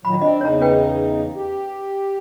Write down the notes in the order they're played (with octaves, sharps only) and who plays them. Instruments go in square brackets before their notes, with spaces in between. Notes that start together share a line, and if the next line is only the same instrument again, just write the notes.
[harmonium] A#2 D#3 F#3 [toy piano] B5
[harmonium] C4 D4 [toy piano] D#5
[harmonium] E2 C#3 D#4 [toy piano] C#5 A#5
[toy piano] C#4 B4 G5
[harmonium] G4